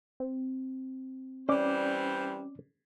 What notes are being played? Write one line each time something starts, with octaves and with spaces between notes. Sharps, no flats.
C4
E3 G3 C#4 C5 D5 D6